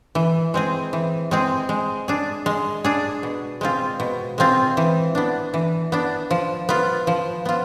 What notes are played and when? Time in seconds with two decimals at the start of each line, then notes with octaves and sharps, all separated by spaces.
0.15 E3
0.54 G#3 C4 G#4
0.93 E3
1.31 G#3 C4 G#4
1.69 G#3
2.08 D4 G#4
2.46 G#3
2.84 D4 G#4
3.23 B2
3.61 G#3 C4 F4
4.00 B2
4.38 G#3 C4 F4
4.77 E3
5.15 B3 D4
5.54 E3
5.92 B3 D4
6.31 F3
6.69 B3 F4
7.07 F3
7.45 B3 F4